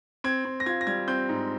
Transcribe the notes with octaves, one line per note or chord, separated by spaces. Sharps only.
C4 G#6
C4
A#6
F4 G#6
A#6
G3 G#6
C4 G6
G#2